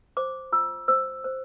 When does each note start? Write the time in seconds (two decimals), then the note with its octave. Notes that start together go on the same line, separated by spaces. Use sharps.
0.17 C5 D6
0.52 F4 E6
0.88 C5 E6
1.24 C5